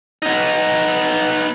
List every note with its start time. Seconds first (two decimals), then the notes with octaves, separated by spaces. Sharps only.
0.22 B3 D#4